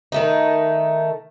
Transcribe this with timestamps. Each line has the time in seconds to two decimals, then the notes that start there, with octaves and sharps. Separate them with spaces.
0.12 D#3 A3 D#4